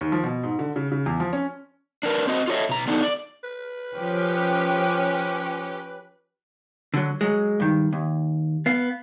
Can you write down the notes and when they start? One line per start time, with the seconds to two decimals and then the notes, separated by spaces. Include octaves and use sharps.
0.01 D#2
0.12 F3
0.24 B2
0.44 G#2
0.59 D3
0.76 C#3
0.92 C#3
1.06 E2
1.20 F3
1.33 C#4
2.03 D4 A#4 B4
2.27 C4 F#4 D#5
2.48 F4 F#4 A4 C#5 D#5 E5
2.69 B2 A#5
2.88 B3 D4 D#4 A4
3.02 D5
3.44 B4
3.96 F3 C#4 G4
6.94 D3 F#3
7.21 F#3 G#3
7.60 G2 D#3
7.93 D#2
8.66 B3 F5